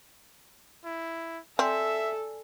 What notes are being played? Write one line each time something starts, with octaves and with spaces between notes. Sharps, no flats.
E4
C4 A4 D5 E5 G#5